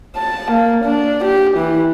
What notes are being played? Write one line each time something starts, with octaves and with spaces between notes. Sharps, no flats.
A5
A#3
D4
G4
E3